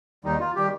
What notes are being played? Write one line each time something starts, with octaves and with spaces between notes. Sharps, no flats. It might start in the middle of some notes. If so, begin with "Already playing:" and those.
D#2 D#3 G3 D#4
F4
D#3 G3 G4